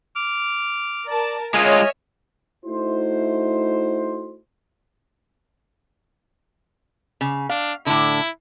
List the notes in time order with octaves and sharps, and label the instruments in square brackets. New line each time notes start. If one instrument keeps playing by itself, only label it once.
[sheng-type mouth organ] D6 F6
[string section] A#4 A5 [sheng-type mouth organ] D5
[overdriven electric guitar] G#3 F4 [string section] C#5 E5 [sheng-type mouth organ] D#5 G#5 F6
[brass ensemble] A3 D#4 E4 F#4 C5
[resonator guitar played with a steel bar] C#3
[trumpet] D4 [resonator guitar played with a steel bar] F5
[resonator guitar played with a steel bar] A2 D3 [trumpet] E4